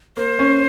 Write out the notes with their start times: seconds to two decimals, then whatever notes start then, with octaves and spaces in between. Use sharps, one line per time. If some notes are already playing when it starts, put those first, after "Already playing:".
0.17 A#3 C5
0.39 C#4